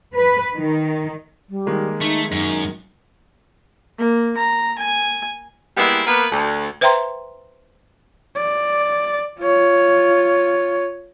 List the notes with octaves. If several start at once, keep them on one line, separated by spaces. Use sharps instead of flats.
B4
D#3
G3
D#3 G#3 A#3
A3 D#4
F#2 D#4
A#3
A#5
G#5
E3 G3 G#3 A#3 B3 E4
A#3 B3 B4
D2
B4 C5 E5 G5 A#5 C6
D5
F4 C#5